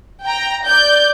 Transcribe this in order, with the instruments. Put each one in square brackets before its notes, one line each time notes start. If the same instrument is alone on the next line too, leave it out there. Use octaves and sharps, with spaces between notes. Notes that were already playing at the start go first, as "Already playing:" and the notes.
[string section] G5 A#5
D5 G6